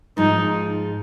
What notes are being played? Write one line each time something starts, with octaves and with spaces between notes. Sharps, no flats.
G#2 F3 G#3 D#4